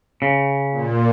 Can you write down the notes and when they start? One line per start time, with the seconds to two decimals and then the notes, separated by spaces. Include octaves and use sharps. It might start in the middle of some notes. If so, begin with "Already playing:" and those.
0.22 C#3
0.72 A#2